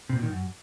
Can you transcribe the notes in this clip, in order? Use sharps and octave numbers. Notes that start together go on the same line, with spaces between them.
C3
A#2
D#3
F#2